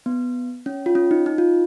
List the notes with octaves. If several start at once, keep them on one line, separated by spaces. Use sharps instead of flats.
B3
C#4
F4
C#4
D#4
D#4
F4